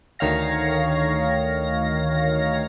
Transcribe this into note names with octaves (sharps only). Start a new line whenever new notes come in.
D2 D#3 C#5 F5 A#6